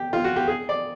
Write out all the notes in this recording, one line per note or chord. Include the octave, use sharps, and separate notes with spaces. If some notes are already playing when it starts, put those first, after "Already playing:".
Already playing: G4
F4
F#4
G4
G#4
D5